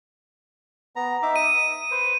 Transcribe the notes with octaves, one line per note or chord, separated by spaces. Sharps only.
B3 A#5
D#4 E5 D6
D#6 D#7
B4 C5